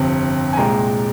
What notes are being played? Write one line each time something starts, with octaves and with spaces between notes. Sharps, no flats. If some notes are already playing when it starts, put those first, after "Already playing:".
Already playing: G1 F2 C3
G#5
C2 A#2 G#3 G5 A#5